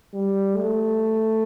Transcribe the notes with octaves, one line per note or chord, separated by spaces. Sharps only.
G3
A3